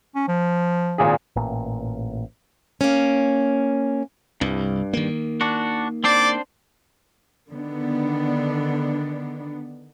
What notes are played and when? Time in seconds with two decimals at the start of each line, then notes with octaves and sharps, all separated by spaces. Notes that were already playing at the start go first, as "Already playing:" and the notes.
0.15 C#4
0.28 F3
0.98 G#1 A#2 G#4
1.36 A1 A#2
2.81 A#3 C#4
4.41 C2 G2
4.93 D#3 A#3
5.41 D4 F#4
6.04 C4 D4 C5 D5
7.51 D3 D#3 B3 D4